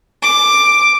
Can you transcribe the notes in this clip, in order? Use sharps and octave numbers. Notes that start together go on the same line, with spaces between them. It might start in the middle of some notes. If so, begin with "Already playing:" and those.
D6